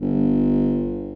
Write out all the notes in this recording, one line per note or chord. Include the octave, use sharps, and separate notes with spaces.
G1